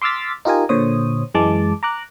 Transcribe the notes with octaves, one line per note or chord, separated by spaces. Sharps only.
C6 D6 E6 F6 A6 B6
D#4 F4 G4 A#4 D#5 G#5
A#2 D3 C5 C#5 D#6
F#2 E3 G#3 A5 D6
A#5 D6 F#6